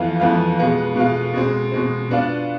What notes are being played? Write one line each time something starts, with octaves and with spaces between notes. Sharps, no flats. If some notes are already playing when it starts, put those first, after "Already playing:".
Already playing: F2 E3 B3 F4
F2 E3 B3 F4
B2 G#3 B3 F4
B2 G#3 B3 F4
B2 G#3 C4
B2 G#3 C4
B2 B3 D4 F4